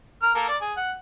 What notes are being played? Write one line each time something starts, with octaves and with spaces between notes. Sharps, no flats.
A#4 F6
A#3 A4 A#4
D5
G#4
F#5